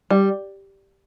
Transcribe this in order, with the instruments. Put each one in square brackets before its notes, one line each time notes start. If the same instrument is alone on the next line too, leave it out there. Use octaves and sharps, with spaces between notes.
[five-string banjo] G3